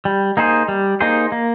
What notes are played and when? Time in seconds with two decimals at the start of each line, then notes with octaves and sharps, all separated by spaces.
0.05 G3
0.37 A#3 D#4 G#4 C5
0.68 G3
1.00 A#3 D#4 G#4 C5
1.32 A#3